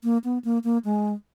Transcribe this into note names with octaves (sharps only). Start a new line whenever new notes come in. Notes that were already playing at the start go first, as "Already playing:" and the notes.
A#3
B3
A#3
A#3
G#3